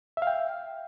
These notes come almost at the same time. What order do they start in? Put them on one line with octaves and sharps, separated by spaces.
E5 F5 G5